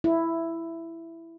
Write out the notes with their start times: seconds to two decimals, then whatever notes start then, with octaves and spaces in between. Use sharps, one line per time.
0.04 E4